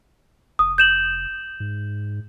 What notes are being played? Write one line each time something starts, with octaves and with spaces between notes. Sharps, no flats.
F1 D#6
G6 E7 F#7
G#2